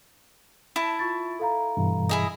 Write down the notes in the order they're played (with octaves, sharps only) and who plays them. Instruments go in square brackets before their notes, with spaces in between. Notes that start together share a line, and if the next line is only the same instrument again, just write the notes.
[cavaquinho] E4 A5
[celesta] F4 C#6 A6
A4 F5 A#5
[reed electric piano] G2 B2 E3
[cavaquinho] E4 G#4 D#5